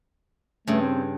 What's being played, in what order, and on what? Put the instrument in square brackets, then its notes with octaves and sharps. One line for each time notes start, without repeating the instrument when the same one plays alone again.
[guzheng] G2 C#3 [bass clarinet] A3
[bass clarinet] C4